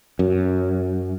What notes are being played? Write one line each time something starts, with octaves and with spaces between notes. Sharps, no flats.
F#2